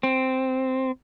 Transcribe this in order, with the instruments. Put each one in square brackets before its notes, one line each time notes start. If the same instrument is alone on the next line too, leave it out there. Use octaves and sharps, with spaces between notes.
[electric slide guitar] C4